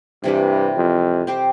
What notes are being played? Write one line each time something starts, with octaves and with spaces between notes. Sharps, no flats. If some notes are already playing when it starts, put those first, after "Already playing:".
G2 C3 E3 G3
F2
C4 G4 C5